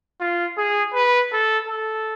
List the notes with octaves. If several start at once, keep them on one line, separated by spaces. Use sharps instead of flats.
F4
G#4
B4
A4
A4